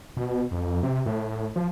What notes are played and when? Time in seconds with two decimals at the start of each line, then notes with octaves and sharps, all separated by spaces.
0.17 B2
0.51 F2
0.83 C3
1.06 A2
1.56 F3